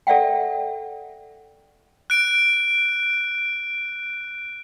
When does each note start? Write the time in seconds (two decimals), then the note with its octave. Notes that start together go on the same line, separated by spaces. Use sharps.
0.07 A4 D5 E5 F#5 G5
2.10 F#6 D7